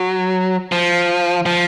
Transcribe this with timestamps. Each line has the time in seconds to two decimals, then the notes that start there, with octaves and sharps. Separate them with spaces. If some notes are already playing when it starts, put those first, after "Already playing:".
Already playing: F#3
0.72 F3
1.46 F3